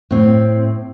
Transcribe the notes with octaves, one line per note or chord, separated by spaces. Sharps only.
A2 C4